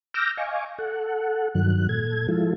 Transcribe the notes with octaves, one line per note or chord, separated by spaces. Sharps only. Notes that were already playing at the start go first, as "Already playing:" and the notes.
D6 E6 F6 G6 A#6
D#5 F5 G#5 C#6 D6
A4 F#5
G2 D#3 F#3 F#6
A#2 A4 G#6
F3 G#3 E4 F4 A4